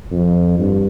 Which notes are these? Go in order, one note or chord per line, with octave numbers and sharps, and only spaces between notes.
F2
G2